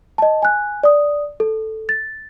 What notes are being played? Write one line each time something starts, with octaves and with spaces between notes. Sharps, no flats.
D#5 A5
G#5 F#6
D5 D#6
A4
A6